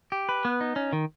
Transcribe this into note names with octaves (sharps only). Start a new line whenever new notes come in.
G4
B4
B3
D#4
C#4
D#3